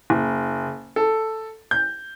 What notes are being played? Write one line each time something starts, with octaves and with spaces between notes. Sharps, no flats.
F#1
A4
G6